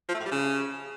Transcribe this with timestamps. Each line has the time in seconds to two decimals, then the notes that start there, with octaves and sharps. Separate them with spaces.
0.09 F3
0.14 A3
0.20 A2
0.26 G3
0.31 C#3